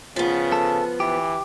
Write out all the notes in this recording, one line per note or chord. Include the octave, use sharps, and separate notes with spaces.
C#3 F3 B3
A4
E3 G4